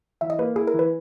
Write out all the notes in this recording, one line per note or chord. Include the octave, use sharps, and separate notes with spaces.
E3 E5
D#5
A#3 B4
E4 G#4
A#4
E3
B4